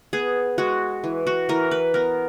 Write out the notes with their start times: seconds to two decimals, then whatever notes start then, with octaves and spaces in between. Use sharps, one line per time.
0.13 B3 G#4
0.58 G#3 F#4
1.04 E3
1.27 F#4
1.49 E3 A#4
1.71 B4
1.94 B3 A#4